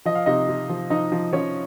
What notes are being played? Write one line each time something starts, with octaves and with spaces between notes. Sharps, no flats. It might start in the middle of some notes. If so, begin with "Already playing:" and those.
F3 D#5
F5
C3 D#4 D#5
C3
F3
F3 D#4 D#5
F3
F3 C#4 C#5